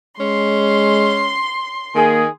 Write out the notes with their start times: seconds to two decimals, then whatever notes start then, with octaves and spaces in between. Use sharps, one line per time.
0.20 G#3 C#4 C6
1.95 D#3 A#3 G#4